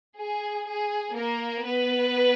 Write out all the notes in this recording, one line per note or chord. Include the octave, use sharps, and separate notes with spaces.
G#4
G#4
A#3 A#4
B3 B4